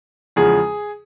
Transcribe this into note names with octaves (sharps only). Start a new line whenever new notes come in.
E2 C#3 F3 G#3 G#4